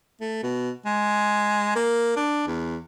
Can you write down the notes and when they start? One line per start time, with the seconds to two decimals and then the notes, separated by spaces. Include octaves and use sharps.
0.21 A3
0.43 B2
0.86 G#3
1.76 A#3
2.16 D4
2.47 E2